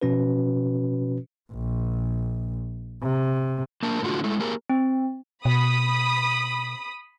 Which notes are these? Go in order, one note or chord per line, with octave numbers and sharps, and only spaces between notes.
B2 F3 C#4 F#4 B4
A#1
C3
A#3 D4 A#4 A5
A2 D3 F4 F#4
G#3 A3 E4
A#3 G4 G#4 A#4
C4
B2 B5 D#6